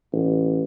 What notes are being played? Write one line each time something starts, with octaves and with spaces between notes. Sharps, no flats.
A1